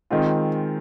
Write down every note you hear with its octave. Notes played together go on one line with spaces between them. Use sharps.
D#3 G#3 C4 F4